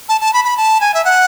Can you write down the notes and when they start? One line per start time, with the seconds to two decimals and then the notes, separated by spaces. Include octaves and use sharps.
0.09 A5
0.21 A5
0.33 B5
0.45 B5
0.57 A5
0.81 G#5
0.94 E5
1.05 F#5